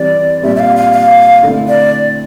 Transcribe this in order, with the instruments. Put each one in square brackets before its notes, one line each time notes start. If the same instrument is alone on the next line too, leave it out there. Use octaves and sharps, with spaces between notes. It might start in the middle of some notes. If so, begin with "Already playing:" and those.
Already playing: [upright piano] E3 G3 C4 [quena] D5
[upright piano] A#2 G3 C4 [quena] E5
[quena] E5
F5
F5
F5
[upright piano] D3 A3 C4 E4
[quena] D5